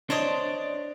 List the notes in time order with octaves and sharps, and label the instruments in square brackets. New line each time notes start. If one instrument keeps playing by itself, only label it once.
[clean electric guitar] D4 [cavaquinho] C5 C#5 D#5